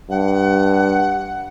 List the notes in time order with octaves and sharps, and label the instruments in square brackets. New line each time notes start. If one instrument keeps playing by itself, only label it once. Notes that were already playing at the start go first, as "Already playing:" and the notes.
[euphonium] G2 [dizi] F#5